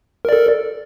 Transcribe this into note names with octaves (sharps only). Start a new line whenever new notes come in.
A4 A#4 D5